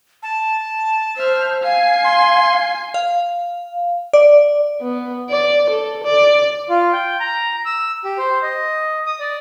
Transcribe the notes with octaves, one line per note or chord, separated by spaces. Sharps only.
A5
C5 E5 F6
F5 G#5 C7
C6
F5
D5
B3
D5
A4
D5
F4
G5
A#5
E6
G4
C5
D#5
D#6
D5